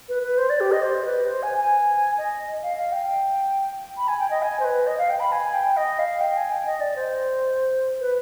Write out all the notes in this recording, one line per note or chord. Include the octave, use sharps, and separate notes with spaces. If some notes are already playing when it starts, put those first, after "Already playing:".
B4
B4
C5
D5
G4
D#5
C5
B4
C5
G#5
G#5
D#5
F5
F5
G5
B5
G#5
G5
D#5
G#5
C5
B4
D#5
F5
G5
B5
G#5
G5
D#5
F5
G5
G#5
G5
D#5
D5
C5
B4